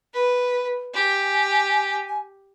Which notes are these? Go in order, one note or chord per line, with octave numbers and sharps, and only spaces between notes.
B4
G4 G#5